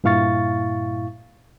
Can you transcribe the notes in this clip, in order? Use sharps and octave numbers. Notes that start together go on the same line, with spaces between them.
G2 A#2 E4 F5 C#6 A6